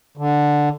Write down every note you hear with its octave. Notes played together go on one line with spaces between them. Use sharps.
D3